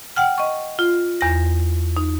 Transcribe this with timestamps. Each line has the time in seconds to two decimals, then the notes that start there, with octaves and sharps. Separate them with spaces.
0.16 F#5 G5 F6
0.38 D#5 C#6
0.79 F4
1.21 E2 A#6
1.97 D#4